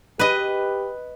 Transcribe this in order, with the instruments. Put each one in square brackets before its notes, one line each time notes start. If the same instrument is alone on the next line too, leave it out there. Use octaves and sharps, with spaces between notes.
[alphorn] G4 [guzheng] B4 D#5